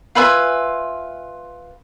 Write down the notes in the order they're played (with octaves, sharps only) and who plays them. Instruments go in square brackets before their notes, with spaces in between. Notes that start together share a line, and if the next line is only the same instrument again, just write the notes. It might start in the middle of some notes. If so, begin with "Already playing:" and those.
[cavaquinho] F4 B4 E5 G#5